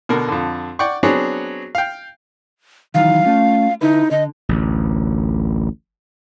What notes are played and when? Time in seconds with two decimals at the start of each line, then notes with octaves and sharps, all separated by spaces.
0.09 B2 D3 A#4
0.28 F2 D3
0.79 D5 F#5 G5 C#6
1.03 F#3 B3 C4 D4 G#4 C#5
1.75 F5 G5
2.94 D#3 E3 F#3 F5
3.24 A3 C#4 F4
3.81 D3 D#4 E4 B4
4.11 D3 D#5
4.49 A1 D2